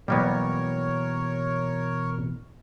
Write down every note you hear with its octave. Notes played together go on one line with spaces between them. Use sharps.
B2 E3 F#3 G3 A#3 B3 A#4 C#5